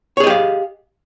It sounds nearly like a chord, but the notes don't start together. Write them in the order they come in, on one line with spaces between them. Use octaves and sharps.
C#5 G#4 D#5 G4 F5